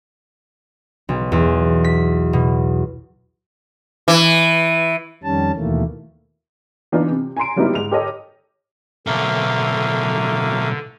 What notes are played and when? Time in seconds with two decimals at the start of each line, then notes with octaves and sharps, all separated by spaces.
1.09 B1
1.32 E2
1.84 B6
2.33 B2
4.08 E3
5.24 F2 D#3 G3 C#4 A5
5.56 D#2 B2 D#3 E3 A3 A#3
6.92 E3 A#3 B3 D4 D#4 F4
7.10 C3
7.37 G#5 A#5 C6 D7
7.56 F#3 G3 A#3 B3 D#4 E4
7.75 G#2 F7
7.91 G4 A4 A#4 C#5 D#5
9.07 B1 A2 D3 A3 A#3 F5